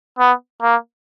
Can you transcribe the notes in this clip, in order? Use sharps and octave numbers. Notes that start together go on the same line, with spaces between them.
B3
A#3